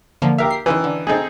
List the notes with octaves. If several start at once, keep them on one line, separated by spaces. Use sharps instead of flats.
D3 F3 A#3
G4 A#4 E5 F5
C7
D#3 E3 C#4 G#4 C5
D3
A3 C4 D#4 G#4 A4